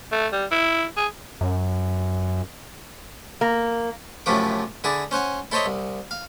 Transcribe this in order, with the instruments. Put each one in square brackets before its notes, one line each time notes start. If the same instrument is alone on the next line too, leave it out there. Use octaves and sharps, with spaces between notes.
[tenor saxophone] A3
G3
E4
G#4
[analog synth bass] F#2
[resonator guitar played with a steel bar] A#3
[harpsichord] F#2 A2 C3 F3 A3 D6
D3 E4 G#4 D5
C#4 C5 F#5 G#5
E4 A4 C5 C#5 D#5 E5
C2
F5